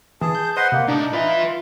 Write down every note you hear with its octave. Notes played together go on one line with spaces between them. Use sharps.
E3 G#4 A5
G6
B4 C5 D#5 F#5 C6
C3 A#3
A2 D4 D#4 D5
F4 B4 E5 B5